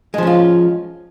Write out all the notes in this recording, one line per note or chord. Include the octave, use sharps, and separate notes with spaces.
F3 G#3 C#4 F4